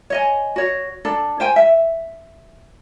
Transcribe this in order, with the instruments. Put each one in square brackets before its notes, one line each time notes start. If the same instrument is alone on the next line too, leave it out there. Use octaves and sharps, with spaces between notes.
[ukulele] C#5 D#5 G#5
F#4 C#5
D4 A4
C5 G5 G#5
E5